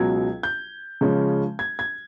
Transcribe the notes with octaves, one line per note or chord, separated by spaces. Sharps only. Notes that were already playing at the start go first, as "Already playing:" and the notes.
Already playing: C#2 B2 F#3 G#6
G6
C#3 F3 G#3 C#4
G#6
G#6